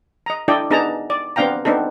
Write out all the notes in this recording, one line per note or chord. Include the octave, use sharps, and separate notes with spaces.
D#5 A#5
D4 E4 A4 D5 D#5 G5
B3 D4 D#4 G#4 A5 A#5
D5
B3 C4 D4 F5 G5 A#5
B3 C4 D4 D#4 A4